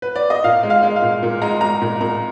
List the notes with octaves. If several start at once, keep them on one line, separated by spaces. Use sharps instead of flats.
B4
D5
D#5
A#2 F5
G#3
F5
G#3
F5
A#2
A#2
G#3 A#5
G#3 A#5
A#2
A#2 A#5